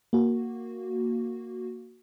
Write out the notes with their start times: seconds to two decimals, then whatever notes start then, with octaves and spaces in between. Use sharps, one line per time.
0.13 A#3 F#4